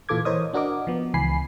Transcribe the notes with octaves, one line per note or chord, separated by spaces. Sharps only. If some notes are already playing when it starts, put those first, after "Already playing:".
A#2 E3 F4 A4 D6 G#6
E3 A#4 C5 C#5 D#5 D#6
D4 F#4 A#4 D#5 D6
F3 B3
C#2 E3 G#5 B5 C7